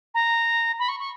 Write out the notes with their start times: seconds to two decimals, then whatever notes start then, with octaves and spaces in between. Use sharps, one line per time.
0.14 A#5
0.79 B5
0.89 C#6
1.00 C#6